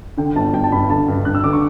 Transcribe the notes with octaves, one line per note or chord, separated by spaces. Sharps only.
D3 G5
G1 A5
G1 G5
A5
G2 B5
D3 A5
G2
G2 F#6
E6
D3 D6
C#6